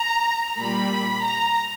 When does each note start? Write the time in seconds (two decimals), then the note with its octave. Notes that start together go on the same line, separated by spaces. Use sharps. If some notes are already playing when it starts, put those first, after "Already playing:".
Already playing: A#5
0.57 A#2 G3 B5
1.21 A#5